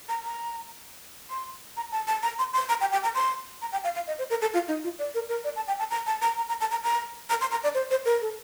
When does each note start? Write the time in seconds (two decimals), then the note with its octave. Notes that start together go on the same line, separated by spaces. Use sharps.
0.09 A#5
0.24 A#5
1.30 C6
1.77 A#5
1.92 A5
2.07 A5
2.23 A#5
2.39 C6
2.53 C6
2.69 A#5
2.81 G5
2.92 G5
3.03 A#5
3.15 C6
3.62 A#5
3.72 G5
3.84 F5
3.95 F5
4.07 D#5
4.19 C5
4.30 A#4
4.42 A4
4.54 F4
4.68 D#4
4.84 F4
4.99 D5
5.15 A#4
5.29 A#4
5.44 D5
5.56 A5
5.68 G5
5.79 A5
5.90 A#5
6.06 A5
6.22 A#5
6.37 A#5
6.49 A#5
6.61 A5
6.71 A#5
6.83 A#5
7.30 A#5
7.41 C6
7.51 A#5
7.64 D5
7.75 C5
7.91 C5
8.05 A#4
8.21 A4